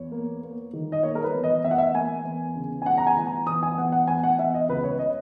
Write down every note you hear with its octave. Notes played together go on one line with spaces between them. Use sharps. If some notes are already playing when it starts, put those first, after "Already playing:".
Already playing: E2 C#5
A#3
A#3
D#3
D#5
A#3 C#5
A#4
B4
E2
D#5
E2 E5
F#5
E5
A#3 G#5
E2
C#3
G#5
E2 F#5
A#5
G#5
E3
A#5
E2 D#6
G#5
E2 F#5
F#5
E2 G#5
F#5
E2 E5
D#5
C#2 B4
C#5
D#5